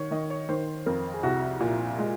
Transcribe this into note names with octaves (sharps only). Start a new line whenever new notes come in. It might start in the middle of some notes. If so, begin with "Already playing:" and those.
Already playing: D#3 C#5
D#3 D#5
C#5
D#3 C5
F2 A#4
G#4
C2 F#4
A#2
G#3